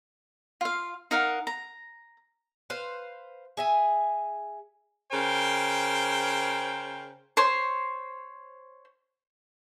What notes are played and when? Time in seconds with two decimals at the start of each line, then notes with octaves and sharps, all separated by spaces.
0.61 F4 F5
1.11 D#4 A#4 F5 F#5
1.47 A#5
2.70 B4 C5 F5
3.57 G#4 E5 G#5
5.12 C#3 A#4 C5 G5
7.37 C5 C#5